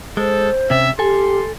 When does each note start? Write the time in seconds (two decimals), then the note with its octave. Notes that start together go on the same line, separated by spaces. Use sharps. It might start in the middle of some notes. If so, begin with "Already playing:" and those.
0.17 G#3 A4 C5
0.70 C3 C#4 E5
0.99 G4 A4 G#5 C6